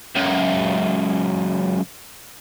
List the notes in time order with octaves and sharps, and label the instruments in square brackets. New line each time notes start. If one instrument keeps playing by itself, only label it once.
[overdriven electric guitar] C#2 F#2